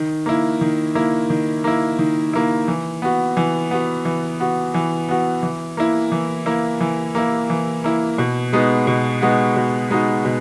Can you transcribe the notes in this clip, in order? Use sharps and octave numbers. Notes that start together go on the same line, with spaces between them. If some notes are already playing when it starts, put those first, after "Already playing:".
Already playing: D#3
A#3 E4
D#3
A#3 E4
D#3
A#3 E4
D#3
A#3 E4
E3
B3 F#4
E3
B3 F#4
E3
B3 F#4
E3
B3 F#4
E3
A#3 E4
E3
A#3 E4
E3
A#3 E4
E3
A#3 E4
B2
G#3 B3 D#4 F#4
B2
G#3 B3 D#4 F#4
B2
G#3 B3 D#4 F#4
B2